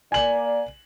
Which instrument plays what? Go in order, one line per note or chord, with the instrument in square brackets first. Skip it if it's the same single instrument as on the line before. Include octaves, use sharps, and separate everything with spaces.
[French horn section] A#3 D5 [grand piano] G#5 F#7